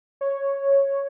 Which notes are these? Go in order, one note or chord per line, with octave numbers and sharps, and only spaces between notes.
C#5